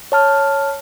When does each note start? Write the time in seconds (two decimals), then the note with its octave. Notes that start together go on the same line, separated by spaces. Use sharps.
0.12 C#5 A5 F6